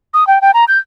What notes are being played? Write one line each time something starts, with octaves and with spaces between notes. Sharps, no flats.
D#6
G5
G5
A#5
G6